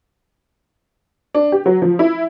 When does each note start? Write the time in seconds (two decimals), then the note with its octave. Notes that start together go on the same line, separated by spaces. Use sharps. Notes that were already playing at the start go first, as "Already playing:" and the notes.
1.34 D4
1.52 G4
1.66 F#3
1.82 F3
1.99 E4